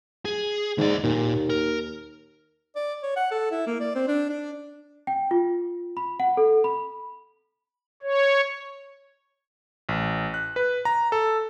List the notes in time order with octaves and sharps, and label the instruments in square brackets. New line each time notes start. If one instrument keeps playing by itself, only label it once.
[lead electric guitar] G#4
[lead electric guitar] D#2 D5 [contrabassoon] G#2
[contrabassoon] D#2 [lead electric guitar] A#2
[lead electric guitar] A#4
[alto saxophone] D5
C#5
F#5
A4
E4
A#3
D5
C4
D4
D4
[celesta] G5
F4
B5
F#5
A4
B5
[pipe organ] C#5
[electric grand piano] A1
F#6
B4
A#5
A4